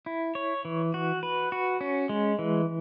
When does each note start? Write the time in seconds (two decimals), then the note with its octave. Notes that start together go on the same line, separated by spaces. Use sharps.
0.06 E4
0.35 C#5
0.65 E3
0.94 F#4
1.23 B4
1.52 F#4
1.81 C#4
2.09 G#3
2.39 E3